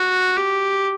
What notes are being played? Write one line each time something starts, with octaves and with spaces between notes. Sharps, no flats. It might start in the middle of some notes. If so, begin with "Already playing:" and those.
Already playing: F#4
G4